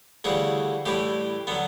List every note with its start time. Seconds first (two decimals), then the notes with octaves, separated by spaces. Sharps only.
0.24 D2 C#3 E3 G3 F#4
0.86 A2 E3 G3 G4
1.47 D3 F#3 B3